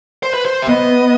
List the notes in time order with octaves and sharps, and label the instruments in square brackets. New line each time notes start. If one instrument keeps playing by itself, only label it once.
[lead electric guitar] C5
B4
C5
E5
[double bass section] B3 [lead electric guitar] D#5